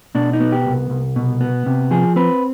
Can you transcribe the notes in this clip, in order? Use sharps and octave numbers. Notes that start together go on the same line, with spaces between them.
B2 D4
D#4
B3
G4
C2
C2
B2
B3
C3
F3 G#4
C4 B4